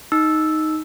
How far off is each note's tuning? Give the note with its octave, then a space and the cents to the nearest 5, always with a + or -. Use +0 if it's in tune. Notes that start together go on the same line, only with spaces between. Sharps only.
D#4 +0 E6 +0